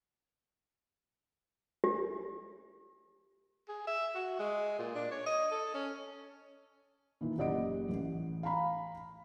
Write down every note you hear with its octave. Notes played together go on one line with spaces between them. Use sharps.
G4
G#4
E5
F#4
G#3
A#2
D4
C#5
D#5
A4
C#4
A#2 D#3 E3
F#1 G4 D5 D#5 F#5 D7
A1
F5 G#5 A#5 B5